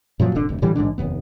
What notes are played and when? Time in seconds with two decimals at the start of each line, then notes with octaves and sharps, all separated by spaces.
0.20 F#2 A#2 F3 F#3
0.35 D#1 G#1 D3 D4
0.49 F1 D2
0.62 A2 D3 E3 G3
0.75 A1 G#2 D3 D4
0.98 F1 D#2 B3